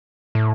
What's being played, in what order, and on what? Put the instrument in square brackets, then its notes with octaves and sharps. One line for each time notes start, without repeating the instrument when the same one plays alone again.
[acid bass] A2